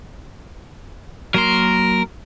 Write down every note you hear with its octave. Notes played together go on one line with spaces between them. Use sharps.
F#3 A#3 A#4 C6